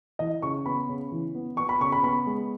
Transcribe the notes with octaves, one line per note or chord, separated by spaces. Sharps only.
E3 D#5
C#3 C#6
B3 B5
C#3
E3
B3
B3 C#6
B5
C#3 C#6
B5
B3 B5
G#3